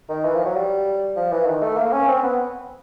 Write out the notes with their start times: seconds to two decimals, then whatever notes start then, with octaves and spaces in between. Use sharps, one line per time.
0.09 D#3
0.25 E3
0.35 F3
0.45 F#3
0.56 G3
1.16 F3
1.32 E3
1.46 D#3
1.62 A3
1.77 A#3
1.93 C#4
2.08 C4
2.23 B3